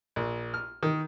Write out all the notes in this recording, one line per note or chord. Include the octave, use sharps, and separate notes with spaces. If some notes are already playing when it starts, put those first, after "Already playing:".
A#1
F6
D#3